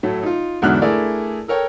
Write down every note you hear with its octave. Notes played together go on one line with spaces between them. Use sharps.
A2 F#3 A3
D#4 F4
E2 G#2 D3 F#3 F6 F#6
A3 D4 E4 G#4 A#4 D5
A4 A#4 C#5 G5